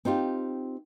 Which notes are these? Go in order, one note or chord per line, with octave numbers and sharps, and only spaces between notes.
C4 D#4 F4 G4